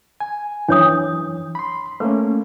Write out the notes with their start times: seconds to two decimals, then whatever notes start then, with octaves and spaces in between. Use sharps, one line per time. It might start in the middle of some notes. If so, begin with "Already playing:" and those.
0.20 G#5
0.68 F#2 E3 D4 C#5 D#6
1.55 B5 C6
2.00 A3 A#3 C#4 B4